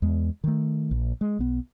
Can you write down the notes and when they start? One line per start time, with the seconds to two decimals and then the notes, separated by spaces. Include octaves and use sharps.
0.02 E2 G#3
0.44 D#3 A3
0.91 A#1
1.21 G#3
1.39 B1 B3